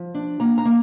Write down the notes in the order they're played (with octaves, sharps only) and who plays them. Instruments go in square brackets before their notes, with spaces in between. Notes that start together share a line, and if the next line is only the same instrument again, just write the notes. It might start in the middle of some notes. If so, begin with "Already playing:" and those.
Already playing: [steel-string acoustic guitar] F3
D4
A#3 A#5
A#5
A#3